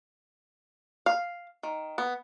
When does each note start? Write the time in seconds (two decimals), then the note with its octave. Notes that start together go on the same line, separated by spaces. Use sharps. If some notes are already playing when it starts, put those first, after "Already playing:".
1.06 F5
1.63 D#3
1.98 B3